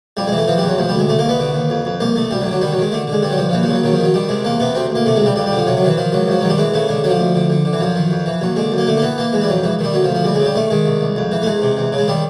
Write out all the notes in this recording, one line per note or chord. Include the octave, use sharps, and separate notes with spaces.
F2 G3
G#3
E3
A3
E3 F3
E2 G3
F#3
D2 F3
G3
D2
G#3
C2 A3
A#3
C2 B3
D3
D#2
F2
F2
C2 A#3
C2 A3
D2 G3
F#3
D3
F#3
D#3 G3
F#3
D#3
G#3
D3 A3
D3
G#3
G2 G3
F#3
G2 F3
F3
D#2 E3
F3
C#3
F#3
D#3 F#3
F3
D#3
F#3
D#3 G3
C3 G#3
E2 A#3
C3 B3
D2 C4
D2 A#3
C3 A3
G#3
C#2 G3
F2 G3
G3
D3
F3
C3 F#3
F#3
D#3 E3
D#3 F3
C#2 F#3
F#2 F3
D#3 F#3
G3
E3 G#3
C#3 A3
D3 G#3
D3 F#3
F3
D2
D3
D3
D3
E3
F#2 F3
D#3
F2
E3
D#2 F#3
D3 G#3
F#2
A#3
D3 A3
A#3
E3 B3
E3 A#3
E3 G#3
G3
F2 F#3
C#2 E3
D#3 G3
D2 F#3
F3
D2
F3
C#2 G3
G#3
C#3
G3
D#3 A3
D#3 G#3
C2
C2
F2
E3
A3
E2 G#3
C3
E2
C#3
G#3
D#3 G3